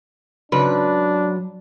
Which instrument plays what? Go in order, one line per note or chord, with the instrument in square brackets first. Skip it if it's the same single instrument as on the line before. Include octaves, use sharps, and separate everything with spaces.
[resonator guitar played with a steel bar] G#2 C#3 B4 [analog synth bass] F#3 [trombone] D4